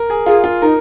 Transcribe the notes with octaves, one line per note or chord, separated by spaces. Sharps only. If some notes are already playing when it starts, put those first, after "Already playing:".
Already playing: A#4
G#4
F4 G#4
F4
D#4 A#4